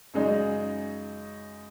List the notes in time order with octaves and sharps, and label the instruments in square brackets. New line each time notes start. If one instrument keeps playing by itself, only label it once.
[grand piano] F#2 C#3 G#3 D#4